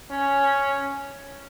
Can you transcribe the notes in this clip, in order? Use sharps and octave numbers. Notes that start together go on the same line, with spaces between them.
C#4